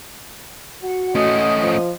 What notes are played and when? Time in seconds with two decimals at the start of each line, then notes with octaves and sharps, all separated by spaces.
0.83 F#4 F#5
1.15 A3 C#4 D#5 F#5 D#6
1.61 F3